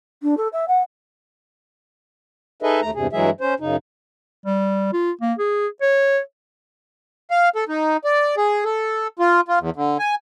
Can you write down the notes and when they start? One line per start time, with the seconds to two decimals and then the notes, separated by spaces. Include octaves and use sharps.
0.23 D4
0.37 A4
0.53 E5
0.68 F#5
2.62 D#4 G#4 A4 B4 D#5 E5
2.82 D#2 A3 A#5
2.95 E2 G2 C3 G#4
3.13 G2 E3 F#3 G#3 G#4 E5
3.41 C#4 C5
3.60 F#2 C#3 D#4
4.45 G3
4.93 F4
5.21 A#3
5.38 G#4
5.81 C#5
7.31 F5
7.55 A4
7.69 D#4
8.04 D5
8.37 G#4
8.65 A4
9.19 F4
9.48 F4
9.60 E2
9.76 D3
9.99 G#5